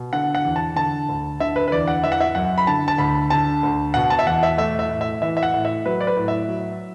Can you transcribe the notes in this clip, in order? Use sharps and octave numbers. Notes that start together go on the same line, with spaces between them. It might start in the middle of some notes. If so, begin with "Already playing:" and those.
Already playing: B2
D3 F#5
F#5
E2
A5
D3 A5
D2
D3 E5
B4
B4
E2 D5
F#5
E3 E5
F#5
E5
F#2 F#5
B5
D3 A5
A5
D2 B5
D3 A5
D2
B2 F#5
A5
E5
E2 F#5
E5
A3 E5
E5
A2
E5
E3 E5
E5
F#5
A2
E5
F#3 B4
D5
B4
A2
E5
F#3